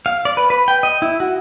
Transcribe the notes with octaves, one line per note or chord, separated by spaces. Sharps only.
F5
D5
B4
B4
G5
D#5
E4
F#4